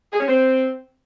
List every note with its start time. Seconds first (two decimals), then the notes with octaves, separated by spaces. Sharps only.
0.13 G#4
0.20 C#4
0.28 C4